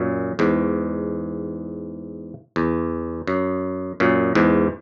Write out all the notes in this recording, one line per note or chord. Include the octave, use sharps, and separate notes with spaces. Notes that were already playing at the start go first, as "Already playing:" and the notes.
Already playing: F#2 A#2
E2 G#2
E2
F#2
F#2 A#2
E2 G#2